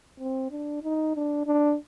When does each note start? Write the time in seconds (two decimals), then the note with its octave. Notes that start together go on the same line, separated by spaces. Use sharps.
0.19 C4
0.51 D4
0.83 D#4
1.15 D4
1.46 D4